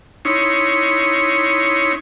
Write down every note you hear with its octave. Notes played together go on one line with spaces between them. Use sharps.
C#4 D#4 E4 C#5 C6